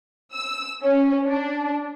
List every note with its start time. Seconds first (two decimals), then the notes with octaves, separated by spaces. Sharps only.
0.33 E6
0.83 C#4
1.25 D4